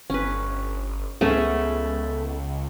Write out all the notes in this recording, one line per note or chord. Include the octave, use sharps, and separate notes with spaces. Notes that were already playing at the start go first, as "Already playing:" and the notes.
G1 C#4 B4
C#2 A3 B3 C#4 G#4